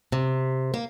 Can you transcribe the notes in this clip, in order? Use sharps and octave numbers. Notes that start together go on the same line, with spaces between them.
C3
A#3